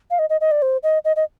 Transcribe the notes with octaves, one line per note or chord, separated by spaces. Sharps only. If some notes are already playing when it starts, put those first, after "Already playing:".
F5
D#5
D#5
D#5
D5
C5
D#5
D#5
D#5